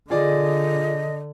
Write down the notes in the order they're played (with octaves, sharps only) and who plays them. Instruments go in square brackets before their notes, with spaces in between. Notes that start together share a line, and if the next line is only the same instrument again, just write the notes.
[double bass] D3 [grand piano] F4 G#4 D5 [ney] D#5